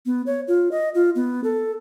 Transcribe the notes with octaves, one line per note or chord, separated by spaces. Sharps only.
B3
C#5
F4
D#5
F4
B3
A4